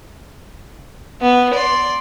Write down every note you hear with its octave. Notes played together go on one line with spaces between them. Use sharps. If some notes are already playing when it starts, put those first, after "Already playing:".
B3
D5 C6